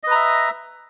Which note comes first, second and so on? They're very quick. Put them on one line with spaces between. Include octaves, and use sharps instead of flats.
D#5 B4 A#5 E5